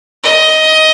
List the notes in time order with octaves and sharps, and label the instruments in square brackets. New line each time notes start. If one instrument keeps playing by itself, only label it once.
[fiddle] D#5